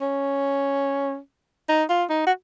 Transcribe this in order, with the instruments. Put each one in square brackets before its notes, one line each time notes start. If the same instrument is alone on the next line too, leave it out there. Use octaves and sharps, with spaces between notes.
[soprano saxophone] C#4
D#4
F4
D#4
F#4